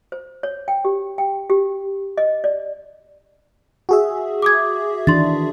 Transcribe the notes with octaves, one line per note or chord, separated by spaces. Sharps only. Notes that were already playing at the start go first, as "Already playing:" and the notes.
C5
C#5
G5
G4
G5
G4
D#5
D5
F#4 G#4 E5
D6 D#6 G#6
D#3 E3 D4 C6 A6